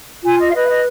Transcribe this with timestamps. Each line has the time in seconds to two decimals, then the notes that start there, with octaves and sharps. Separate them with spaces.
0.23 F4 G#5
0.39 D#5
0.49 F5
0.54 B4 D#5
0.64 F5
0.68 D#5